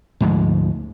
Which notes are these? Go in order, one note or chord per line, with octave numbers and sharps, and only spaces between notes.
D2 G#2 F3 G#3